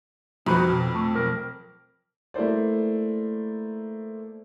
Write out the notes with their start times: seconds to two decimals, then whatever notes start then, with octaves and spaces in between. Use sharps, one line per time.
0.46 F2 C4 D#4 F#4 B5
0.68 B2
0.95 A3
1.15 B1 A#4
2.34 A3 A#3 E4 C5 D5